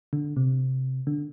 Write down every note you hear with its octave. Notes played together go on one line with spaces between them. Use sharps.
D3
C3
D3